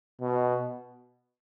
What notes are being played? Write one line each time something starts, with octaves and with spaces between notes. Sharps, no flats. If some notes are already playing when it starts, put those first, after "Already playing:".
B2